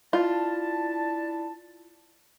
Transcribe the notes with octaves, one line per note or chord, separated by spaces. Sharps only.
D4 E4 F4 A5